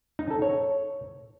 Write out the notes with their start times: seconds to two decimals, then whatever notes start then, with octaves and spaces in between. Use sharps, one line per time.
0.19 D#4
0.30 A4
0.42 C#5